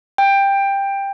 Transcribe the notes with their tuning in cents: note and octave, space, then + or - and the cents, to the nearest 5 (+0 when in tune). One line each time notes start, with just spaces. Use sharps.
G5 +15